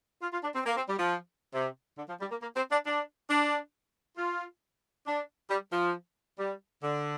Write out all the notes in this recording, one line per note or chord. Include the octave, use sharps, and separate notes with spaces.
F4
F4
D4
C4
A#3
C4
G3
F3
C3
D3
F3
G3
A#3
A#3
C4
D4
D4
D4
F4
D4
G3
F3
G3
D3